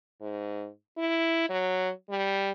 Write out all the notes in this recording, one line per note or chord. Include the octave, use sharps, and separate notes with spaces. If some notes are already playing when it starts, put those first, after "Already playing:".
G#2
E4
F#3
G3